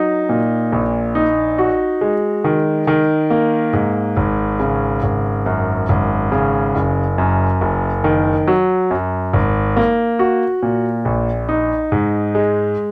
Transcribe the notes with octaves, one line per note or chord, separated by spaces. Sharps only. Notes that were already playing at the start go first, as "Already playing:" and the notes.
Already playing: F#3 D#4
A#2
A#1
D#4
F#4
G#3
D#3
D#3
A#3
G#2
G#1
C#3
G#1
F#2
G#1
C#3
F#1
F#2
F#1
D#3
F#3
F#2
G#1
A#3
F#4
A#2
A#1
D#4
G#2
G#3